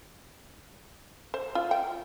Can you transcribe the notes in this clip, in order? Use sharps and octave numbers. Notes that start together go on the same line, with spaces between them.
C5
F4
G5